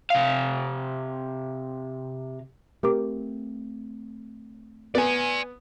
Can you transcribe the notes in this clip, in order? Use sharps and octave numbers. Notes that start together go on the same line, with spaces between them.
C3 F5
A3 C4 G4 A#4 D6
B3 D5 G#5